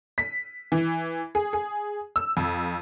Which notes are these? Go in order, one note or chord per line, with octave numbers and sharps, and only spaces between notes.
B6
E3
G#4
G#4
E6
F2